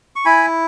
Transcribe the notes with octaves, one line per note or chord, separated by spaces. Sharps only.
C#6
E4 G#5 B5